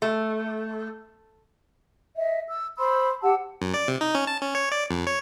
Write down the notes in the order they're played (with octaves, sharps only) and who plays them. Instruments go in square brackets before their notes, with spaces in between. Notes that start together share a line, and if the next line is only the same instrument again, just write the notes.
[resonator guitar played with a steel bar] A3
[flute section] D#5 E5
E6
C5 B5 C6 E6
G4 F#5 A5 E6
[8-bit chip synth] F#2
D5
C3
D#4
C#4
A5
C#4
C#5
D5
F2
C#5